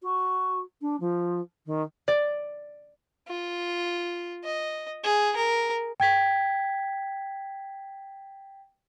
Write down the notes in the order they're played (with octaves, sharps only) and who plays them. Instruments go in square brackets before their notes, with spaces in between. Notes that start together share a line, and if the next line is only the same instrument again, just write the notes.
[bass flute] F#4
D4
F3
D#3
[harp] D5
[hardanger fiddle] F4
D#5
G#4
A#4
[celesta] G5 G#6 B6